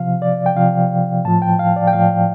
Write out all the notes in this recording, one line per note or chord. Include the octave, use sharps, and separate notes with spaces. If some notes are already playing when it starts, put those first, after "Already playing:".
Already playing: C3 F3 F5
D5
G5
C3 F3 F5
A2 F3 A5
G5
F5
D5
G5
A2 F3 F5